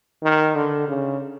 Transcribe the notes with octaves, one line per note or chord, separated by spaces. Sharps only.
D#3
D3
C#3